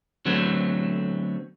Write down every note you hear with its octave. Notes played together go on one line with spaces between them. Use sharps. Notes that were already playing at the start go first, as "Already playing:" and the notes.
D3 F#3 A3 B3 C4